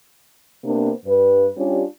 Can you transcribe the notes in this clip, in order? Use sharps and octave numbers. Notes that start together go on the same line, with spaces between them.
C3 A#3 B3 D4 C5
G2 B4
G3 C#4 D4 F4 G4